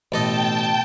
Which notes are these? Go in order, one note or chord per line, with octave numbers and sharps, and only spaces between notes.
A1 B2 A3 A4 D#5 G5 A5 G6